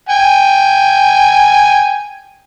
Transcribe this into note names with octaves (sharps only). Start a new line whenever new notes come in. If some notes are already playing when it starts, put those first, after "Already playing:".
G5 G#5